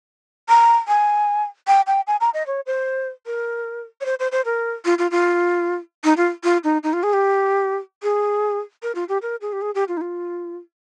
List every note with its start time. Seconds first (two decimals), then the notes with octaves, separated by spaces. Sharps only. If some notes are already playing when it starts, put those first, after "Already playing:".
0.49 A#5
0.88 G#5
1.68 G5
1.87 G5
2.07 G#5
2.21 A#5
2.34 D#5
2.47 C#5
2.67 C5
3.26 A#4
4.01 C#5
4.06 C5
4.20 C5
4.32 C5
4.45 A#4
4.85 F4
4.99 F4
5.11 F4
6.04 D#4
6.17 F4
6.44 F4
6.64 D#4
6.84 D#4
6.93 F4
7.03 G#4
7.13 G4
8.03 G#4
8.83 A#4
8.95 F4
9.09 G4
9.22 A#4
9.41 G#4
9.53 G4
9.62 G#4
9.75 G4
9.88 F4
9.97 D#4
10.01 F4